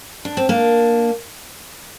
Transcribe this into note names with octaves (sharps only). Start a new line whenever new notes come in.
D4
C4
A#3 D4